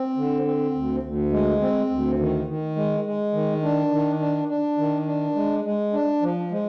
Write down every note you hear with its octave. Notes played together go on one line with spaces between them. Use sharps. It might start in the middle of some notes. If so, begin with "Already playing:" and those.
Already playing: C4
D3
C4
D2
D2
G#3
C4
D2
D#3
D#3
G#3
G#3
D#3
D4
D#3
D4
D4
D#3
D4
G#3
G#3
D4
F3
G#3